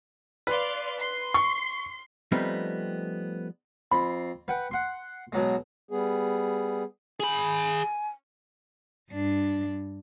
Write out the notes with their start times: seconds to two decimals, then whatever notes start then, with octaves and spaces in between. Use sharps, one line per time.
0.47 B4 D5 F5 C6
0.99 C6 C7
1.34 C#6
2.32 F3 G3 A3 B3 C4 D#4
3.92 F2 B5 C6
4.48 B4 F#5 G5
4.71 F#5 C6
5.32 B2 F#3 G#3
5.91 G3 B3 G#4
7.20 G#4 G#5 B5
9.11 G2 D4